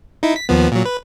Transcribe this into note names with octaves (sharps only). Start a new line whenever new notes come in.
D#4 E4
B6
D#2 F3 B3
A#2 F#3
B4